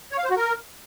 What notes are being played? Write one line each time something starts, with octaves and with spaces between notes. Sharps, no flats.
C#5
F5
C5
F#4
A#4